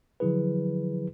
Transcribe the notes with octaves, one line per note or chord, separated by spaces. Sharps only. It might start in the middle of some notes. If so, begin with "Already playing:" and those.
D3 F3 F#3 E4 G#4 B4